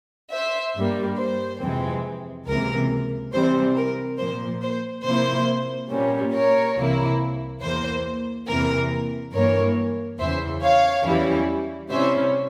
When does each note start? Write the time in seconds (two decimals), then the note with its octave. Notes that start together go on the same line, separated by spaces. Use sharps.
0.32 C5 E5
0.76 G2 G3 A#3
1.18 C5
1.61 F2 C3 E3 G#3 C4
2.47 C#2 C3 E3 A#3 A#4
3.33 C3 E3 G3 C4 C5
3.76 A#4
4.18 A#2 F3 A#3 C5
4.62 C5
5.04 C3 F3 A#3 E4 C5
5.90 A#2 G3 A#3 C#4
6.33 A#4 C#5
6.76 C2 C3 E3 A#3 E4
7.61 E2 E3 A#3 C5
8.47 E2 C3 E3 A#3 A#4
9.33 G2 E3 A#3 A#4 C#5
10.18 E2 C#3 E3 C5 E5
10.62 C#5 F5
11.05 E2 E3 G3 C#4 E4
11.90 C3 G3 C#4 E4 C5 E5